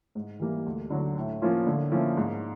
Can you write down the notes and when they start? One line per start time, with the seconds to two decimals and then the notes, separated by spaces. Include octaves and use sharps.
0.15 G#2
0.40 E3 G3 A#3
0.66 D2
0.90 D3 F#3
1.17 A2
1.42 F3 A#3 C#4 F4
1.67 D3
1.92 F3 A#3 C#4 E4
2.17 G#2